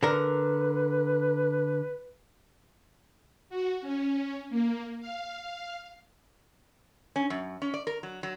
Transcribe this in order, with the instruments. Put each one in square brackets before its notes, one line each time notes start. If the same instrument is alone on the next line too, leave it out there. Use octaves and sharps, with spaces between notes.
[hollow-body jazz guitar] D3 A#4 [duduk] B4
[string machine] F#4
C#4
A#3
F5
[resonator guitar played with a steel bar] C#4
F#2
C#4
D5
A#4
F#3
F#3